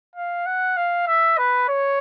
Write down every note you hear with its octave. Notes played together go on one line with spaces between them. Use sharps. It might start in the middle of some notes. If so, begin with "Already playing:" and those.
F5
F#5
F5
E5
B4
C#5